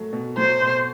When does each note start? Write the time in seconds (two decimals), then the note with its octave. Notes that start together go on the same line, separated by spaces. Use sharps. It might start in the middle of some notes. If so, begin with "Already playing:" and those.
Already playing: F#3 A3
0.13 B2
0.37 F#3 C5
0.61 B2